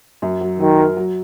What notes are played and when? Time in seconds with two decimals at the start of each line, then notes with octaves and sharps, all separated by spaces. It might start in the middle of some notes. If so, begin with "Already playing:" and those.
0.22 F#2
0.41 F#3
0.59 D#3 F#3
0.78 A#4
0.97 F#3